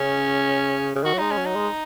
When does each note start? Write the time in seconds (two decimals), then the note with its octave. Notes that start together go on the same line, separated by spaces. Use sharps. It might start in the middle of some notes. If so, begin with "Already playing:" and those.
Already playing: C#3 C#4
0.95 C#3
1.04 D#3 F#4
1.13 F#3
1.18 G#3 D#4
1.32 C#4
1.38 F#3
1.46 D#4
1.55 G#3